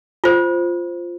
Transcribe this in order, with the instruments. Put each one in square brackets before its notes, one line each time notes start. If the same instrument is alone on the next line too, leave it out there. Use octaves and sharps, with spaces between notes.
[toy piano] F4 C5